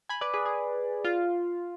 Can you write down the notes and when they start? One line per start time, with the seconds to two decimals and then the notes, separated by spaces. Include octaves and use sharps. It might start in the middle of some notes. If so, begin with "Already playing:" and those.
0.09 G#5 B5
0.21 B4 D5
0.34 G#4 B4
0.45 G#4
1.05 F4